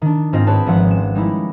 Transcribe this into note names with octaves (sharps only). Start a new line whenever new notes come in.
D#3 D4
G#2 C4 F4 D#5 A#6
C4 G#4 B4 C#5 G5 A5
G#1 G#2 F3 E5 F#5
C#4 E7
G3 G#3 D#4 E4